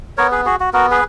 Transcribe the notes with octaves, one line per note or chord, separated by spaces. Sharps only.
B3 A#4 C#5
G#4 B4
F#4 G#4
F#4
B3 F#4 A#4
G#4 B4